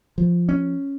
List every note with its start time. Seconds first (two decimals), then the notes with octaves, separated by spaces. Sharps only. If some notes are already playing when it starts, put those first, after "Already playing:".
0.18 F3
0.49 C#4